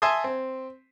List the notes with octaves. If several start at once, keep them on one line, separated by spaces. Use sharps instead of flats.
E5 G#5 A5 C6 D#6
C4